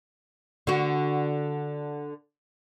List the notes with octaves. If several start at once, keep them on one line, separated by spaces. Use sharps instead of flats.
D3 F#4